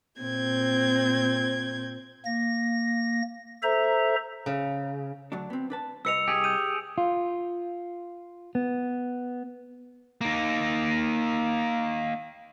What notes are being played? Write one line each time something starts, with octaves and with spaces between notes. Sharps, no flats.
A#2 C4 G6 G#6
A#3 A#6
A4 C5 E5 A#5
C#3
D2 F#3 D4
B3 C4
D4 B4 A5
C2 B4 D#5 E6 C#7 F7
G4 G#4
D6 G6 D#7
F4
B3
A#3 D#4